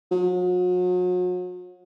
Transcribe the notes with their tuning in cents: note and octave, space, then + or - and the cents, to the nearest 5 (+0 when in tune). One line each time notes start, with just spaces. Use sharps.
F#3 -40